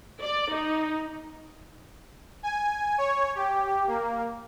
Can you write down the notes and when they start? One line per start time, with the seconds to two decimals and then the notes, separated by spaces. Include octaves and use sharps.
0.23 D5
0.55 D#4
2.43 G#5
2.98 C#5
3.35 G4
3.87 A#3